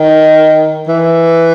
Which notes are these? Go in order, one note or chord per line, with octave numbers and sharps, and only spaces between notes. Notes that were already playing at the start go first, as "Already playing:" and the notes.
Already playing: D#3
E3